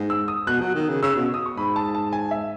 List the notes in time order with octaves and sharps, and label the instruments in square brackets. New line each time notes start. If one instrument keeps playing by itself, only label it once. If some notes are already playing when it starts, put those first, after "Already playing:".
Already playing: [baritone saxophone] G#2
[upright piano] E6
D#6
[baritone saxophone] B2 [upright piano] F#6
[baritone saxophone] F#3
D#3
C#3
[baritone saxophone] C#3 [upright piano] E6
[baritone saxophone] B2
[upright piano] D#6
C#6
[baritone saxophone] G#2 [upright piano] B5
[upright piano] A5
A5
G#5
E5